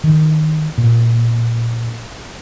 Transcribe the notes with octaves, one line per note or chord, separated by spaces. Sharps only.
D#3
A#2